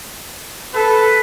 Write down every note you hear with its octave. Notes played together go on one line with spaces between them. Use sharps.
A4 B4